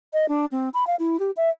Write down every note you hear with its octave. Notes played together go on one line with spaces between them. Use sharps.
D#5
D4
C4
B5
F5
E4
G4
E5